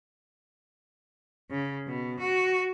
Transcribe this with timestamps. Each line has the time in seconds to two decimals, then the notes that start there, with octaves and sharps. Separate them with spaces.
1.51 C#3
1.87 B2
2.20 F#4